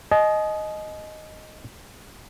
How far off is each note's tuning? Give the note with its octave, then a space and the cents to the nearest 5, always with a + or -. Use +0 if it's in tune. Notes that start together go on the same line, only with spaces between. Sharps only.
D#5 +0 G#5 +45